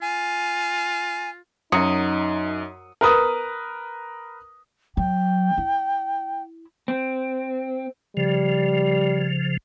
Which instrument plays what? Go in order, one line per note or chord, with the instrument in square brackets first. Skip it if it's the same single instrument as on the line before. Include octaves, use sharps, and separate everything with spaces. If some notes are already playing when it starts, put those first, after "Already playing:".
[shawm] F4 [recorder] G#5
[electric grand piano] F#2 C#7 [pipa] F#3 [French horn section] D#4 [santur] D#6 E6
[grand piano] A#4 B4 D#6
[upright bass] F#3 [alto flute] G5
[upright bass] E4
[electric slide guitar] C4
[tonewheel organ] C#3 F3 [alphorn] G3